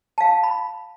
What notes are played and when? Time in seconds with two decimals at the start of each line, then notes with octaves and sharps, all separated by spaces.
0.18 F5 A5
0.43 B5